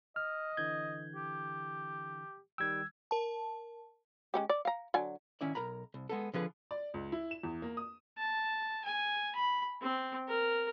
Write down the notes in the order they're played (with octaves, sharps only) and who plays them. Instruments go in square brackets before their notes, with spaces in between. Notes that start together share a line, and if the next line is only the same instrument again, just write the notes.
[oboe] D#5 [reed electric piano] F6
[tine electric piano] D3 E3 G6 [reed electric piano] G#6
[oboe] G4
[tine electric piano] D#3 G3 G5 [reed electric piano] E6 G#6
[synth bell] A#4 A5
[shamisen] G#3 C#4 G4
D5
F5 A#5
D3 F#3 G#5
[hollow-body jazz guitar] D#3 C#4 E4 D5
B1 A#4 A#5 B5
C2
G#3 B3 A4
D3 F3 G#4 B4
[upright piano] D5
C#2
E4
E7
E2
A#3
D#6
[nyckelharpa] A5
G#5
B5
C4
A#4